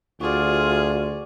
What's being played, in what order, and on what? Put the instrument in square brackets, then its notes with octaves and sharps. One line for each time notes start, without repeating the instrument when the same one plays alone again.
[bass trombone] D2 [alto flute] F4 [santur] F#4 D5 [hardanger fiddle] G#4